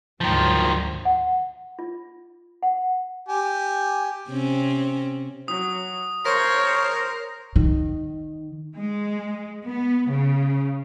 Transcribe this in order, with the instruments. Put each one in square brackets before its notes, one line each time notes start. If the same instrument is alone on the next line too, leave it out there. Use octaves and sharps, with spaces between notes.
[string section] D2 G#2 F#3 [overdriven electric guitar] D#3 F3
[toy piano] F#5
F4
F#5
[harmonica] G4 G#5
[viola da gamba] C3 C4 C#4
[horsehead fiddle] F#3 [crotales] D#6
[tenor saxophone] A#4 [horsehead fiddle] C5 [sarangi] C#5 [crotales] A#6
[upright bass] D#3
[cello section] G#3
B3
C#3